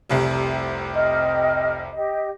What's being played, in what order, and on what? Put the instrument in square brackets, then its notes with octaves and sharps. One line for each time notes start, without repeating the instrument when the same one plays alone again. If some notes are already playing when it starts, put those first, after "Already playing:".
[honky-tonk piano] F1 C2 C3
[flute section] D#5 G5 F6
G4 D#5